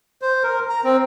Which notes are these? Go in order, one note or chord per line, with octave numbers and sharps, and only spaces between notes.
C5
A#4
A#5
C4